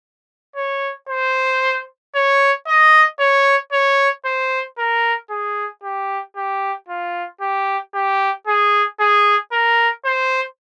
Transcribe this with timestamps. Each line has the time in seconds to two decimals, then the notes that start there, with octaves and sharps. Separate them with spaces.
0.56 C#5
1.09 C5
2.15 C#5
2.67 D#5
3.20 C#5
3.72 C#5
4.25 C5
4.78 A#4
5.30 G#4
5.83 G4
6.36 G4
6.89 F4
7.41 G4
7.94 G4
8.47 G#4
9.00 G#4
9.52 A#4
10.05 C5